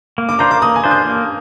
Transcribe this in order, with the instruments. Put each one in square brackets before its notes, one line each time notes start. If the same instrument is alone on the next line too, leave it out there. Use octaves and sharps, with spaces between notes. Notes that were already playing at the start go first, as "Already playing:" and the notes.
[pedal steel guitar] A#3
[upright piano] D6
[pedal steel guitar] D4 F4 C5 [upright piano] A#5
[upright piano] D6
[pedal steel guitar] A#3 [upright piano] D#6
[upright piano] G#5
[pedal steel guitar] D4 F4 C5
[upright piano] G6
[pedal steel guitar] A#3